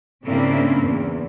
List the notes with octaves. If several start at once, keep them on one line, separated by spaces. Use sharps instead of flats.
G#2 C#3 A#3 C4 D4 E4
E2